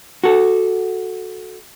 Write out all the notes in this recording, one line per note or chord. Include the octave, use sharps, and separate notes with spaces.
F#4 A4